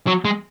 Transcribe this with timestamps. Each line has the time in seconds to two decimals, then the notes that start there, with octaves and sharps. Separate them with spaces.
0.07 F#3
0.25 G#3